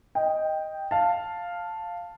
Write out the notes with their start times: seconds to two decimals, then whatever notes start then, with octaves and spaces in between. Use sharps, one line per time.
0.15 D#5 G5
0.91 F5 A5